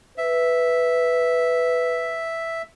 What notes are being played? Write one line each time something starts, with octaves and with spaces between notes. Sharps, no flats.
B4 E5